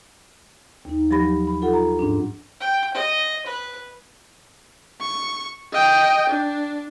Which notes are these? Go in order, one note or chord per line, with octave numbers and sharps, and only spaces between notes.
D#2 D#4
F3 F#3 G4 B5 A#6
B5
F4 A4 F#5
A#5
G#2 C#4 D4
G5
D#5
B4
C#6
D#5 G5
D4